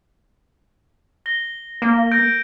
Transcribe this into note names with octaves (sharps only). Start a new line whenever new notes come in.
A#6 G7
A#3
G6 A#6 D7